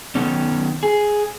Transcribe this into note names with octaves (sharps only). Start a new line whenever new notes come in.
D#3 B3 C#4
G#4